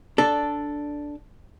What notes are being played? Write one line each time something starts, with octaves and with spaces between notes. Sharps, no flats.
D4 A4